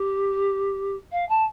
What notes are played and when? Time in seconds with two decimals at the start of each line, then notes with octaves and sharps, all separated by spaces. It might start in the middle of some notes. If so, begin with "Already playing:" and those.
Already playing: G4
1.12 F5
1.29 A5